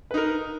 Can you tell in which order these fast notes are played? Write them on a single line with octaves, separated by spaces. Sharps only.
B4 D#4 A#4